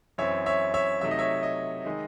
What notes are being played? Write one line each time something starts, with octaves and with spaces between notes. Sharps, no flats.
F#2 E3 C4 C#5 E5
C#5 E5
C#5 E5
C3 F#3 A3 D#4 E5
D#5
C#5 E5
D#5
D#3 G#3 D#4